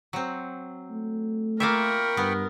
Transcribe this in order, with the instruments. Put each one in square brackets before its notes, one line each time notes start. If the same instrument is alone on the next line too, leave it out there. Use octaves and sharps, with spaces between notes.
[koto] F#3 C4
[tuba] A3
[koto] A#3 F4 E5 [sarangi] A#4 [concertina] G5 B5 C#6
[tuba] G2 [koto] B3